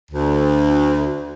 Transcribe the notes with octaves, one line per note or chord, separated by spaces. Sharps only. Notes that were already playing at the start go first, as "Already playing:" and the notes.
D2